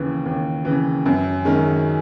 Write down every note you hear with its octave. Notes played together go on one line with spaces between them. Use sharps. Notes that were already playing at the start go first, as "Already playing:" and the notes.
Already playing: D#2 C#3 E3
D#2
C#3 E3
F#2
D#3 G#3 C#4